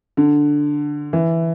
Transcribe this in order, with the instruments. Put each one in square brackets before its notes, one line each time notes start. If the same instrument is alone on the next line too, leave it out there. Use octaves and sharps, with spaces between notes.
[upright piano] D3
E3